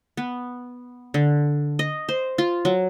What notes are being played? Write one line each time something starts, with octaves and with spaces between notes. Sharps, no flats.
B3
D3
D#5
C5
F4
F#3